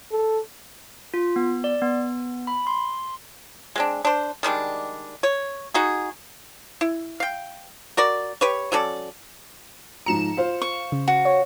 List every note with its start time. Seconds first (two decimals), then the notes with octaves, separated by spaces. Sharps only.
0.12 A4
1.14 F4
1.36 B3
1.64 D5
1.82 B3
2.47 B5
2.67 C6
3.76 G#3 C4 D4
4.05 D4 C5
4.43 D#3 G3 G#3 D4
5.23 C#5
5.74 D#4 F#4 G#4
6.81 E4
7.20 F5 G5
7.97 F#4 A#4 D5
8.41 G4 B4 C#5
8.72 F#3 C#4 A4 D5
10.06 G#2 F3 A#5 C#7 E7
10.37 F4 C5 F5
10.62 C#6
10.92 C#3
11.08 F#4
11.25 C#5